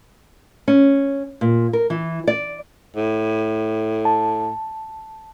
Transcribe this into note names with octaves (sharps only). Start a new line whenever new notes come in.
C#4
A#2
A#4
E3
D5
A2
A5